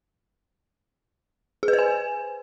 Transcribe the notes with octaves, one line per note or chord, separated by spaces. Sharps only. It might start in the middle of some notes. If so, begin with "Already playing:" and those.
G#4
B4
C5
G#5